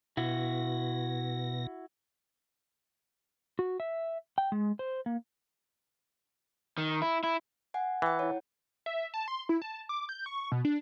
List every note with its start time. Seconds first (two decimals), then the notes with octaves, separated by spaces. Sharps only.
0.17 B2 E4 F#4 A#6
3.59 F#4
3.80 E5
4.38 G5
4.52 G#3
4.79 C5
5.06 A#3
6.78 D#3
7.02 E4
7.24 E4
7.74 F#5 G#5
8.02 E3 F#5 G5
8.19 E4 C#5
8.86 E5
9.14 A5
9.28 C6
9.49 E4
9.62 A5
9.89 D6
10.09 G6
10.26 C#6
10.52 B2
10.65 D4